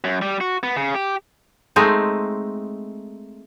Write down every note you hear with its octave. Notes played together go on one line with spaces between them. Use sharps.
F#2
G3
F#4
B3
C#3
G4
G#3 A3 C4 D#4